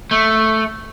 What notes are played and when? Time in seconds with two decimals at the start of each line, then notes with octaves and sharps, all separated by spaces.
0.11 A3